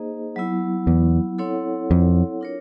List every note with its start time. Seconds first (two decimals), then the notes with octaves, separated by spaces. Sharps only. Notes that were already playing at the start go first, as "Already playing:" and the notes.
Already playing: A#3 D#4 G#4 C5 D#5
0.36 F#3 B3 E4
0.87 E2
1.38 C4 E4 A4 C#5 F#5
1.91 F2
2.41 D4 F4 A#4 C#5